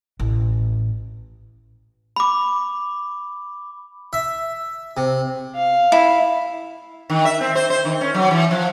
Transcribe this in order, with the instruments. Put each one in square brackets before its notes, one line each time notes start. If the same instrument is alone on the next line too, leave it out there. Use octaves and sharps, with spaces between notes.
[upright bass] A1
[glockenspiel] B5 D6
[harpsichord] E5
C3
[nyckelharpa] F5
[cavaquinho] E4
[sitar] D#3
E5
C4
C5
C5
D#3
C#4
F#3
E3
F3